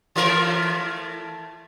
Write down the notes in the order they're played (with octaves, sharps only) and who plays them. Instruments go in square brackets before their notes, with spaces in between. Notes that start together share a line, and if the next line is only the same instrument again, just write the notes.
[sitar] E3 A3 A#4